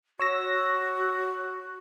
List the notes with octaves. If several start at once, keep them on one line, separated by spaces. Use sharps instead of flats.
F#4 C#5 E6 A#6